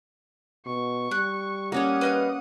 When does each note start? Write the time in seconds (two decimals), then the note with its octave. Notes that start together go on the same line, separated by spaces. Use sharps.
0.66 B2 C#6
1.11 G3 F#6
1.72 A#3 C#4 C#5 F#5 D#6
2.01 B4 D#5 F5